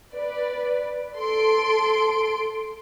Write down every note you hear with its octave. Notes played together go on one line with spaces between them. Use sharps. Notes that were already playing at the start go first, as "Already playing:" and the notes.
B4 D5
A4 C6 D7